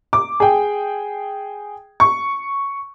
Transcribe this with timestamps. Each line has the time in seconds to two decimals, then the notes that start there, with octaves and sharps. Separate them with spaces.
0.13 D6
0.40 G#4 G5
2.00 C#6